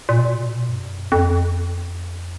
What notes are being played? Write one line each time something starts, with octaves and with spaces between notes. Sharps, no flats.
A#2
B2
A#2
B2
G2
F#2
F2